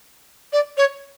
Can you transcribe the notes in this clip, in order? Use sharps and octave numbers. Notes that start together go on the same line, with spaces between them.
D5
C#5